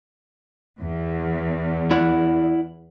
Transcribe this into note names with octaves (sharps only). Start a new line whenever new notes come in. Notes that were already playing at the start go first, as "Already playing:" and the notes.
E2
E4 D5 F#5